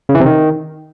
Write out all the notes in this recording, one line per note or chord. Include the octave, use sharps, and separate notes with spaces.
C#3
E3
C3
D#3